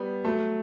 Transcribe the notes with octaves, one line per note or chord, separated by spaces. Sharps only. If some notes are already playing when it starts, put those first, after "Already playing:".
Already playing: G3 B3
F#3 A3